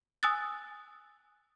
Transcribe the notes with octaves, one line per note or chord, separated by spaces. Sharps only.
G#5 D#6 E6 F#6 A6